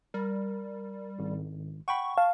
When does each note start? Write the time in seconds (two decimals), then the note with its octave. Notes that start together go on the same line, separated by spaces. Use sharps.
0.14 G3 A#4
1.19 G#1
1.88 F#5 G5 B5 C#6
2.18 F5 A5